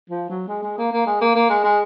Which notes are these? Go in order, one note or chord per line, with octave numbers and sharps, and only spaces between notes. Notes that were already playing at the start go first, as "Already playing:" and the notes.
F3
F#3
G#3
G#3
A#3
A#3
G#3
A#3
A#3
G#3
G#3